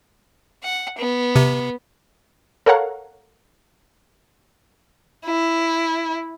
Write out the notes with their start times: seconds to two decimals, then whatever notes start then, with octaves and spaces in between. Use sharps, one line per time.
0.63 F#5
0.98 B3
1.36 C3
2.66 A4 A#4 C#5 F5 F#5 A#5
5.25 E4